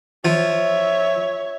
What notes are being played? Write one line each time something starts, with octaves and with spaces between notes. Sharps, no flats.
F3 C#5 E5